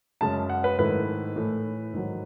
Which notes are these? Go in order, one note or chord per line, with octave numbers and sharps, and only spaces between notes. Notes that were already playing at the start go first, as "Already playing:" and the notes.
F#2 C#3 G#3 C#4 A5
F#5
B4
G#2 D#3 A3 E4 B4
A2 E3 A3
G#2 D#3 F#3